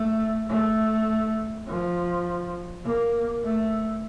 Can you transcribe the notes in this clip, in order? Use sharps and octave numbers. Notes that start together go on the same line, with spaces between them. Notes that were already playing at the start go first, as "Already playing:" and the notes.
Already playing: A3
A3
F3
A#3
A3